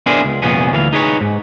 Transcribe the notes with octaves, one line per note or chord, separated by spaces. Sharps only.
B3 D4 E4 G#4 A#4 C5
C#2
C2 F2 A#2 B3 C#4 G#4
D2 E3 A4 F5
D#4 G#4 B4 C#5
G#2